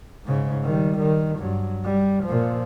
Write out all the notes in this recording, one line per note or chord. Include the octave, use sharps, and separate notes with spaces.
G#2 C#3
D#3 G3
D#3
G2 F#3
G3
A#2 F3